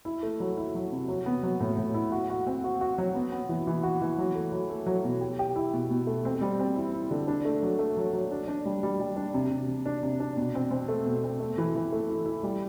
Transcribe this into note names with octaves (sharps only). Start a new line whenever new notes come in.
E4
A3
F#3
E4
F#3
C3
F#3
B3
F#3
A2
A2
E4
F#4
F#4
C4
F#4
F#4
F#3
B3
B3
E3
E3
F#4
E3
F#3
A3
F#3
A3
F#3
B2
G4
G4
E4
B2
B2
A3
C4
G3
C4
E4
E4
D3
D4
A3
F#3
A3
F#3
F#3
D4
D4
G3
G3
G3
D4
C3
C3
C3
D4
C3
D4
B2
C4
C4
A3
B2
C4
A3
E3
E3
A3
E4
E4
G3